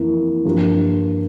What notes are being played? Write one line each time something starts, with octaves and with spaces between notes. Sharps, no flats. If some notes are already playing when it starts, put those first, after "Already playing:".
Already playing: F2 E3 A#3 E4
G2 F3 A#3